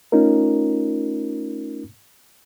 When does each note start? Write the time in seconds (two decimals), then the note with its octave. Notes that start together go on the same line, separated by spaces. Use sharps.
0.12 A3 C#4 D#4 F4 A#4